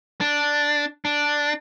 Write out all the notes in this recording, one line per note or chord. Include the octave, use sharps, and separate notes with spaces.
D4
D4